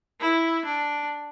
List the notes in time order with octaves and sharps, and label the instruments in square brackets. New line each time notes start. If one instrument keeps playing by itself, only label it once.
[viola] E4
D4